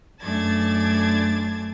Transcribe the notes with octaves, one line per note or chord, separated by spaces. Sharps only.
F#2 A3 D4 A5 G#6 A6